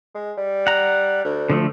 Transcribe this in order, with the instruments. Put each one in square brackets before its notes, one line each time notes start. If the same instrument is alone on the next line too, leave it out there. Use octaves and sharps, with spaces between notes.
[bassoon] G#3
G3
[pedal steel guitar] F#5 A#5
[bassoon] D2
[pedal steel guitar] D3 F3 A3